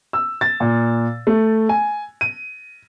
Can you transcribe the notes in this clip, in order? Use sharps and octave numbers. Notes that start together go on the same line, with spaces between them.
E6
A6
A#2
A3
G#5
D#7